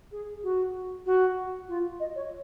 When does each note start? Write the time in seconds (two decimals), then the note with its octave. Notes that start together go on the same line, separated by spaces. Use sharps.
0.12 G#4
0.43 F#4
1.06 F#4
1.69 F4
2.00 D#5
2.16 C#5